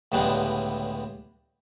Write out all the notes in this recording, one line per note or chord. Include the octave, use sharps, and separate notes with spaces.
C#2 A2 D3 G3 G#3 B3